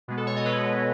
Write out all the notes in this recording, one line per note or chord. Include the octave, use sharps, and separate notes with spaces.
B2 G#3 B3
A4
C#5
D#5
B2 G#3 B3 B4